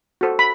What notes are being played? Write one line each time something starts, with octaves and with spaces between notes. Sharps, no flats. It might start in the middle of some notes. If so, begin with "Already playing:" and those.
F#4 A4 C5
B5